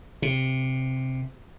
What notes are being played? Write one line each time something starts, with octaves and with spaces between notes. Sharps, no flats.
C3